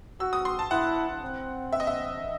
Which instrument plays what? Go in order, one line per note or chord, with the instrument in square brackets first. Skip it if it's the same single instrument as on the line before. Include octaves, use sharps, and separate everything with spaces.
[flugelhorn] F#4 [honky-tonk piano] E6
[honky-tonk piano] D#6
C6
A5
[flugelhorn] E4 [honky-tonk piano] F#5
[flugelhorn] C4
[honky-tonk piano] E5
D#5
E5